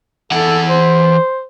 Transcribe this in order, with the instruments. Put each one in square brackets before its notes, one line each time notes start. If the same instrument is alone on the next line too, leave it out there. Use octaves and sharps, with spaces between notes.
[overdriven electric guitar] E3 F#5 [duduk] A4
[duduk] C5